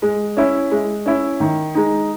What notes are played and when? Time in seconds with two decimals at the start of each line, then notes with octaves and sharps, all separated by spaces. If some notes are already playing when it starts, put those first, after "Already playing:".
0.02 G#3
0.37 C#4 E4
0.71 G#3
1.06 C#4 E4
1.40 D#3
1.75 G#3 D#4